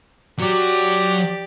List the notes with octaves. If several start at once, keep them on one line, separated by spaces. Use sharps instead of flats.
F#3 G4 D5